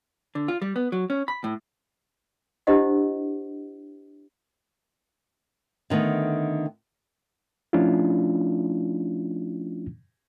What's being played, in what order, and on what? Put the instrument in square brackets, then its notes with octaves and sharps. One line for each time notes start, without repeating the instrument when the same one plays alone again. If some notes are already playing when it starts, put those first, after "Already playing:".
[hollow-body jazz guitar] D3
F4
G3
B3
F#3
C#4
B5
A2
[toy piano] D4 E4 G4 C5 D#5 F#5
[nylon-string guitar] D3 D#3 A3 B3
[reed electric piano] F3 A3 C#4 D4 E4 F4